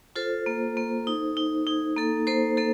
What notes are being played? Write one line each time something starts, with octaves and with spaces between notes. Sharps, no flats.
F4 A4 C5
A#3
A#3
D#4
D#4
D#4
A#3 A4
A#3 A4 C5
A#3 A4